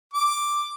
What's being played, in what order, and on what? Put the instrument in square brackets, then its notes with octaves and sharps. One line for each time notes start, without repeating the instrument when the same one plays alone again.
[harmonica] D6